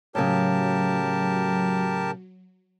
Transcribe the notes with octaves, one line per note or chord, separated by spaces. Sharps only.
A2 C#3 F#3 G4 A#4 A5